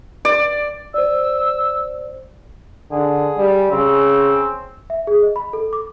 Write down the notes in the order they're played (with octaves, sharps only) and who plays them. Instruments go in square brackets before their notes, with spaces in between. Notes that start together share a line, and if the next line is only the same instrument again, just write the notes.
[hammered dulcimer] D5
[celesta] C5 D5 [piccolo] E6
[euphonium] D3 [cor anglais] G#4
[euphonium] G3
[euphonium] C#3 [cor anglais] C4
[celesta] E5
G#4
D#5
B5
A4
D6